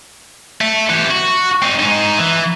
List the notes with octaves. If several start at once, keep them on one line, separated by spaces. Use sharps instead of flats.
A3
E3 G4
F#4
C4 D#4
G#2 D#4
E3